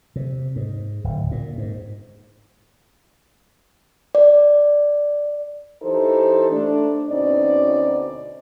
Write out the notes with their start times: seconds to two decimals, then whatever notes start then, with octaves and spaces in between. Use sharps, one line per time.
0.16 C3
0.56 G#2
1.04 D1
1.31 A#2
1.58 G#2
4.15 D5
5.83 E3 D#4 G4 A4 C5
6.51 A3 D4
7.09 D2 B2 C4 C#4 D#4 D5